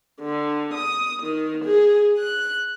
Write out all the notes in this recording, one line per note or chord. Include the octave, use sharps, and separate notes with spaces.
D3
D#6
D#3
G#4
F#6